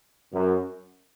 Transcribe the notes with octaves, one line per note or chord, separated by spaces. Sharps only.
F#2